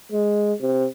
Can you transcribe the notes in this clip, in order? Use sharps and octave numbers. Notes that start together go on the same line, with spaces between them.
G#3
C3